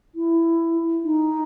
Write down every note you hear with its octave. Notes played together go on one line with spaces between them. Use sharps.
E4
D#4